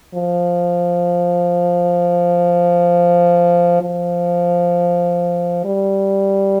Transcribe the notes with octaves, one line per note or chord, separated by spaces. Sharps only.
F3
F3
G3